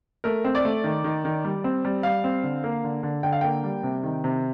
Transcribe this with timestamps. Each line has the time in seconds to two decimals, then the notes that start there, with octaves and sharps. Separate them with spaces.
0.24 A3 A#4
0.44 C4
0.55 D5
0.65 A3
0.84 D#3
1.04 D#3
1.25 D#3
1.45 G3
1.64 C4
1.85 G3
2.03 G3 F5
2.24 C4
2.43 D3
2.64 A#3
2.84 D3
3.03 D3
3.23 D3 G5
3.32 F5
3.41 A#3 G5
3.64 G3
3.83 C3
4.03 D#3
4.24 C3